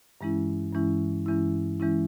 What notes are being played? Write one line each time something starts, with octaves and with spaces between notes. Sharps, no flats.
G2 E3 G#3 C#4 E4
G2 E3 G#3 C#4 E4
G2 E3 G#3 C#4 E4
E3 G#3 C#4 E4